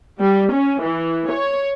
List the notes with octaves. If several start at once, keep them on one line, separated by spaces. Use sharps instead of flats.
G3
C#4
E3
C#5